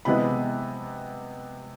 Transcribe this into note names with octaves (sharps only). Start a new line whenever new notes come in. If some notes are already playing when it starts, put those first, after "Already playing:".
C3 E3 G#3 B3 B5